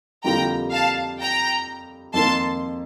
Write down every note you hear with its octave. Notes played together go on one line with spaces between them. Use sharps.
F2 D3 G3 A#3 F4 G5 A#5
F5 A5
G5 A#5
F2 D#3 A#3 A5 C6